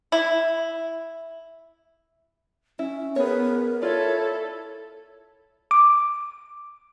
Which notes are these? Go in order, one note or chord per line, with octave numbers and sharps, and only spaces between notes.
E4
C#4 E4
B3 G#4 A#4 C#5
E4 F4 A4 C#5 D5
D6